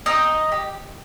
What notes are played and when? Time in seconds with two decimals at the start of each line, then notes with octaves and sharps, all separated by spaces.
0.06 C4 D#4 D#5
0.52 G4